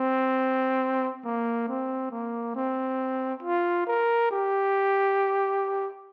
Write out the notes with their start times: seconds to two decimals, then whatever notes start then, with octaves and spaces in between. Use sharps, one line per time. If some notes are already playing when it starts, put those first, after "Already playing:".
Already playing: C4
1.24 A#3
1.68 C4
2.11 A#3
2.55 C4
3.42 F4
3.87 A#4
4.31 G4